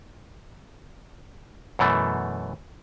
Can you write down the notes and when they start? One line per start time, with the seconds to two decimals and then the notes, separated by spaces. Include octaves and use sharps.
1.79 F#2 B2 E3 A3